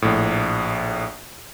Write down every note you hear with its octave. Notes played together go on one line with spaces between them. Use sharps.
A#1 A2